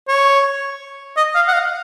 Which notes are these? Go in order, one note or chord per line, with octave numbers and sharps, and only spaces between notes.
C#5
D#5
F5
F#5
F5